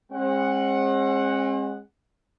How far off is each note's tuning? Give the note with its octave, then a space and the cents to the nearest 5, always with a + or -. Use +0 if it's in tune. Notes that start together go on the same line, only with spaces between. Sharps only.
G#3 -25 C4 +45 F#5 +0